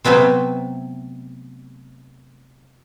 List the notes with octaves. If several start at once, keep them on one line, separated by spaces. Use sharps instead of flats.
C3 F#3 A3 B3 C4